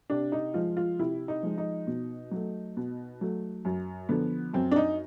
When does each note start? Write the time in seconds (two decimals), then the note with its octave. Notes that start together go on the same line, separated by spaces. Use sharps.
0.10 C3 D4
0.32 D#4
0.54 F3 G#3 F4
0.77 F4
0.99 C3 E4
1.28 D#4
1.43 F3 G#3
1.58 D#4
1.87 B2
2.31 F#3 A3
2.77 B2
3.21 F#3 A3
3.65 F#2
4.09 D3 F3 B3
4.54 F#2 C4
4.72 D4
4.76 D#4